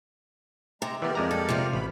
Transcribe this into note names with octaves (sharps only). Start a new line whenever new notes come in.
C3 G#3 A#5
E3 B3 G4 A#4 D5
F2 G#3 A#5
A4
C3 F4
A1 B5